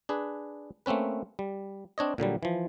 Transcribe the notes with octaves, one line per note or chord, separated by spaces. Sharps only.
D4 G#4 B4
A3 A#3 C4 C#4 B4
G3
C4 D4 C#5 D#5
A#2 D3 F#3 G3
E3 F3